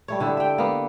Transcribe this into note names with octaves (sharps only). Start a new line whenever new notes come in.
G3 A3 C#5
D3 E4 G4 A4
E5 G5
A#3 B3